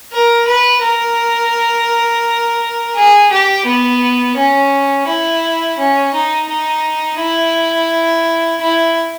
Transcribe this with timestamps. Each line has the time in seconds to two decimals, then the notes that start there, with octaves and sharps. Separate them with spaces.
0.12 A#4
0.48 B4
0.83 A#4
2.96 G#4
3.31 G4
3.66 B3
4.37 C#4
5.08 E4
5.78 C#4
6.14 D#4
6.49 D#4
7.20 E4
8.61 E4